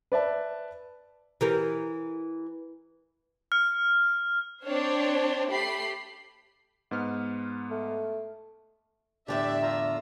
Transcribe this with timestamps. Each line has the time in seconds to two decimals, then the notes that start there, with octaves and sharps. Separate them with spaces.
0.12 B4 D5 E5 A5
1.41 E3 G4 A#4
3.52 F6
4.63 C4 D4 C5 C#5
5.50 A3 G4 B5 C7
6.91 G#2 B3 F6
7.71 A3
9.28 E2 A2 D3 D4 G4 D5 E5
9.62 F4 A#5 E6